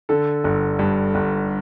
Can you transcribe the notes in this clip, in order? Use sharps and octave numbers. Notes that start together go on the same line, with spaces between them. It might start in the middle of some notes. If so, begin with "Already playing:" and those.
D3 A4
G1
G2
G1